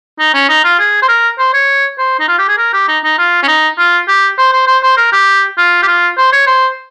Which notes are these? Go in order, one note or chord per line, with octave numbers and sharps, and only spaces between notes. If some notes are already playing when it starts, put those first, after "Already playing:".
D#4
C#4
D#4
F4
G#4
C5
A#4
C5
C#5
C5
D#4
F4
G4
G#4
A#4
G4
D#4
D#4
F4
C#4
D#4
F4
G4
C5
C5
C5
C5
A#4
G4
F4
G4
F4
C5
C#5
C5